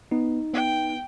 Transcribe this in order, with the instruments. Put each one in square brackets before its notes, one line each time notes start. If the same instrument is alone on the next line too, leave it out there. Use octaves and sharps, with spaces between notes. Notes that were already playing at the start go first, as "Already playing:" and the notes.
[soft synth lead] B3 [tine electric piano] D#4
[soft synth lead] B3 [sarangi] G5